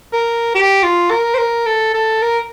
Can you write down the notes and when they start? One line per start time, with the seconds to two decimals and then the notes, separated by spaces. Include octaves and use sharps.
0.13 A#4
0.55 G4
0.83 F4
1.11 A#4
1.34 C5
1.38 A#4
1.66 A4
1.94 A4
2.22 A#4